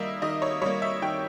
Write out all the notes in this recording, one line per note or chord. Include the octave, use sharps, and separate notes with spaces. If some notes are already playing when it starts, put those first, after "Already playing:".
Already playing: D#3 G3 A#3 D#5 E5
D#3 D#5
C#5
G3 A#3 C#5
E5
D#3 G5